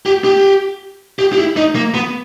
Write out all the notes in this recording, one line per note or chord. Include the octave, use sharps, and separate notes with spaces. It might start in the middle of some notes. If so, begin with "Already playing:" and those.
G4
G4
G4
G4
E4
D#4
A#3
B3